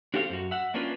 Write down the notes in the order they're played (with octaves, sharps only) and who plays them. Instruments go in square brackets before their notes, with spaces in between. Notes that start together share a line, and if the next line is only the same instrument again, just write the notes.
[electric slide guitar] D4 F#4 G4 A4 C5 F5
F#2 F#4
E5 F#5
A#3 C#4 D4 F4 B4